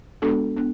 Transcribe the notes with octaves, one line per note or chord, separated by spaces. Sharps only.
G#3 B3 D4 F#4 A4
B3 D4